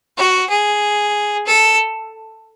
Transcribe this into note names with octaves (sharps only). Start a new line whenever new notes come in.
F#4
G#4
A4